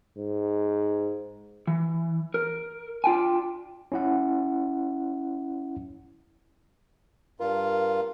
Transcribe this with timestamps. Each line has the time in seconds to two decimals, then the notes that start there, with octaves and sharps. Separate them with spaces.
0.18 G#2
1.67 E3
2.34 A#4
3.04 D4 F4 G5 G#5
3.92 C#4 E4 F#5
7.40 G2 F4 A#4